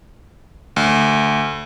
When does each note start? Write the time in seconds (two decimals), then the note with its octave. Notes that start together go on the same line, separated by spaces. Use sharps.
0.76 D2